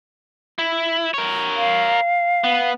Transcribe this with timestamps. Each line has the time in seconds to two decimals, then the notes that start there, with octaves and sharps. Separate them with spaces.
0.59 E4
1.14 A#4 C#5
1.56 F5
2.44 B3